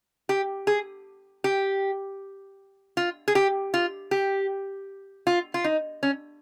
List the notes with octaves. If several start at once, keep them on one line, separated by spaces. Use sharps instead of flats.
G4
G#4
G4
F4
G#4
G4
F4
G4
F4
F4
D#4
C#4